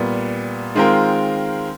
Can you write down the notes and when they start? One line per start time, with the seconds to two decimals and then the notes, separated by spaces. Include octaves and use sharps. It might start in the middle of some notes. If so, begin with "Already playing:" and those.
Already playing: A#2 G3 B3
0.75 D#3 G#3 C4 F4 A#4